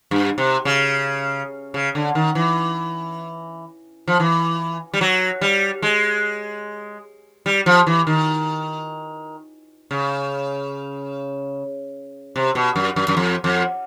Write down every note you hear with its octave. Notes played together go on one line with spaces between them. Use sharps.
G2
C3
C#3
C#3
D3
D#3
E3
F3
E3
G3
F#3
G3
G#3
G3
F3
E3
D#3
C#3
C3
B2
F#2
F#2
F#2
F2
F2